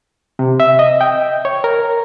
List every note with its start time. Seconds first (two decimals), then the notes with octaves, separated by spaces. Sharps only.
0.39 C3
0.60 E5
0.79 D#5
1.01 G5
1.45 C#5
1.64 A#4